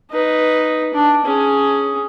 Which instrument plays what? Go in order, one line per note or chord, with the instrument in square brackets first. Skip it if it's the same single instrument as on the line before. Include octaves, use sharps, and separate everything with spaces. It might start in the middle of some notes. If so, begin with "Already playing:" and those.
[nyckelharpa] D#4 B4
D4
C#4 G#4